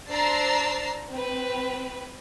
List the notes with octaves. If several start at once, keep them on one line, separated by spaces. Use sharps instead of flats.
D4 C5 A#5 E6 A6 C7
C4 B4